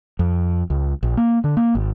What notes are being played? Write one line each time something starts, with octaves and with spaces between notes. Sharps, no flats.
F2
C#2
A#1
A#3
D3
A#3
G#1